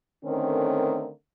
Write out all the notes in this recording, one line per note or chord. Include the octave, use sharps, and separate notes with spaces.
D3 D#3 A3 C4 C#4 A#4